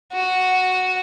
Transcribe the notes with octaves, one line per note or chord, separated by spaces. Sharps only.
F#4